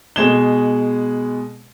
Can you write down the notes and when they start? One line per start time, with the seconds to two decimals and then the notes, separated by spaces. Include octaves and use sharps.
0.16 B2 G#3 G#6 E7 G7